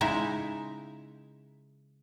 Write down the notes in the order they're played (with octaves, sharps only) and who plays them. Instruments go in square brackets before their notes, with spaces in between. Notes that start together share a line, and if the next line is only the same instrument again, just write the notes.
[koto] C#3 G#3 D#4 E4 E5